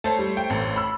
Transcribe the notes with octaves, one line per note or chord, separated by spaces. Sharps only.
A3 C5 C#5 A5
G3
G5
A1
B5 E6